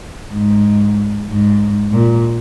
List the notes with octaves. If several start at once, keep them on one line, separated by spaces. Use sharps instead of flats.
G#2
G#2
A#2